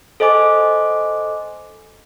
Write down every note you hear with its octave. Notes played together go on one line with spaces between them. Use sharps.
A4 C5 D#5 G#5 D6